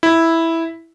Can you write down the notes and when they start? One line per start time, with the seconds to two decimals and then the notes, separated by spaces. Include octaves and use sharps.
0.03 E4